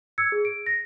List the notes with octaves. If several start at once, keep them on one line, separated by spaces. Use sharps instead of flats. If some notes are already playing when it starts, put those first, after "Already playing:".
E6 G#6 C#7
G#4
D7
A#6